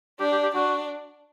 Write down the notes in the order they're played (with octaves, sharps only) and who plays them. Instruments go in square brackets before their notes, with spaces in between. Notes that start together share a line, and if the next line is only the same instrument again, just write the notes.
[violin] D4 [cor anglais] G4
[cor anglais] G4
G4
[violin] D4 [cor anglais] F#4